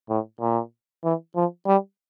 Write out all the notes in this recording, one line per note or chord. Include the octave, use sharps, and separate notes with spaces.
A2
A#2
E3
F3
G3